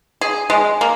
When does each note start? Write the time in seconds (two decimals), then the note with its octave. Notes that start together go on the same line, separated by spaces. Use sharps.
0.21 G#4
0.50 G#3
0.81 A#3